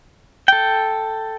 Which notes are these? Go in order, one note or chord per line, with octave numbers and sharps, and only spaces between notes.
A4 G5